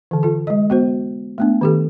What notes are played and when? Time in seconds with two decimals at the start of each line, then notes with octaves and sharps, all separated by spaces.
0.11 D3 E3
0.23 F4 A4
0.47 G#3 D#5
0.70 B3 F#4 C5
1.38 A3 B3 D4
1.61 D#3 G4 A4